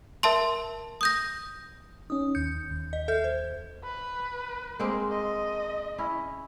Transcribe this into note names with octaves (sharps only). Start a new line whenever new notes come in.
A#4 E5 A5 C6
D#6 G6 A#6
C#4 D#4 D#6
D#2 G6 C#7
D#2
D#5
A4 E5 G6
C5
B4
G#3 A#3 C4
D#5
C#4 E4